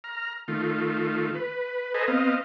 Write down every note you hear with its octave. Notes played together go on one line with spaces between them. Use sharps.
A#5 F6
D#3 A3 F4
B4
A4 B4 C5 D#5 G#5 A#5
B3 C4 D#5 F5